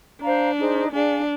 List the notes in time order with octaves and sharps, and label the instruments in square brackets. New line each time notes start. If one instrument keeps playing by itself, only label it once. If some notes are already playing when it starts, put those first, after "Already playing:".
[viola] D4 [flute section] C5 F5 A#5
[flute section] D#4 G#4 C5
[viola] D4 [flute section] G#4 D5 F5 G#5